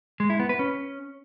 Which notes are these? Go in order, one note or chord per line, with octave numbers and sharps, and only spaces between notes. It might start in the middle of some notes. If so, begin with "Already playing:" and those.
G#3
E4
B3
B4
C#4